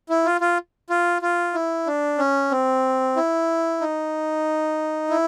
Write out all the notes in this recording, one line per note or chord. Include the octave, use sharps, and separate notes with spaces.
E4
F4
F4
F4
F4
E4
D4
C#4
C4
E4
D#4
E4